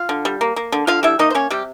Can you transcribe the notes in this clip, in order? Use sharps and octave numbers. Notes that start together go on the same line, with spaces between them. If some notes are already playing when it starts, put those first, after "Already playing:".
Already playing: F4 F5
D3
G3
A#3
A#3
D3
D3 F4 F5
G3 E4 E5
A#3 D#4 D#5
C5
A#3 C#4 C#5
C3 G3 G4